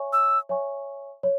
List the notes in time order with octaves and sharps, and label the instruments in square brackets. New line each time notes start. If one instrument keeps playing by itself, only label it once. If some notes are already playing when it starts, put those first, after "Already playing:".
Already playing: [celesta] C#5 E5 G#5 C#6
[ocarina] E6
[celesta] C#5 E5 G#5 C#6
C#5